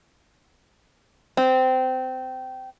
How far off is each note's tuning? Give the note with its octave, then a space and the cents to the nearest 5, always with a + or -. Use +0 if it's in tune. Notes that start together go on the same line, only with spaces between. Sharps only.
C4 -20